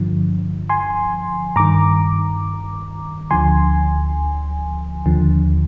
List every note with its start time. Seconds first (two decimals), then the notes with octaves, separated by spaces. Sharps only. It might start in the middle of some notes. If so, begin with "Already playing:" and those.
Already playing: G2 D3 F3
0.69 G#5 C6
1.56 G2 D#3 A#5 D6
3.31 D2 D3 F3 G#5 C6
5.06 D#2 D3 F3